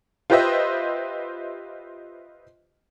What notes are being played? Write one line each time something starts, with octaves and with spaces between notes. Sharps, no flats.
F4 G4 B4 C5 D#5 E5